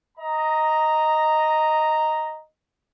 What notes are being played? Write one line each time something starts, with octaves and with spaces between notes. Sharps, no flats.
D#5 A#5